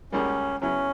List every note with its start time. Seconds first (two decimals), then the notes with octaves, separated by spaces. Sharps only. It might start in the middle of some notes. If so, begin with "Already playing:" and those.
0.12 C#2 C#3 G3 A#3 C#4
0.62 C#3 F#3 B3 C#4 E4